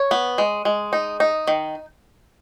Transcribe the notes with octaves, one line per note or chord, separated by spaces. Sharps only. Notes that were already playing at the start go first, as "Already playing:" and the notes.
Already playing: C#5
B3
G#3
G#3
D#4
D#4
D#3